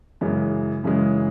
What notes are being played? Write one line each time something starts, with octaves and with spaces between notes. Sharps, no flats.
F#2 C#3 E3 G#3
F#2 C#3 E3 G#3